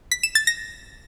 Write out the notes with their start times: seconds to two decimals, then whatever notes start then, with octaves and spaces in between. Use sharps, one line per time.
0.11 B6
0.23 E7
0.35 A6
0.47 A#6